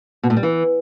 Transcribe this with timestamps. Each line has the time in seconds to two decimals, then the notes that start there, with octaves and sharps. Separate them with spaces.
0.23 B2
0.30 A2
0.36 G3
0.43 E3